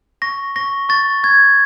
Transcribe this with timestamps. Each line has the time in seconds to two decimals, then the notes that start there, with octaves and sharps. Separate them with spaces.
0.22 C#6 A#6
0.56 C#6 A#6
0.89 C#6 A6
1.23 C#6 G#6